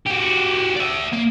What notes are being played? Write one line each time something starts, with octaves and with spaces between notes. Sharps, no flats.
F#4 G4
D5 E5
A#3